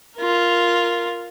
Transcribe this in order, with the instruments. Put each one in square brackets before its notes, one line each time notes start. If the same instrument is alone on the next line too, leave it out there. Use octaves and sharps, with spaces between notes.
[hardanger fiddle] F4 A#4